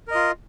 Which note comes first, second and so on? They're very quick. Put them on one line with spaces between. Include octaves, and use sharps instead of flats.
A#4 D#5 F4